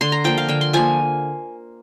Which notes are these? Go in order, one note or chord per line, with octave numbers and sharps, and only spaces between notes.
D3 C6
A#5
F3 A#3 G5
F5
D3 G5
C6
F3 A#3 G#5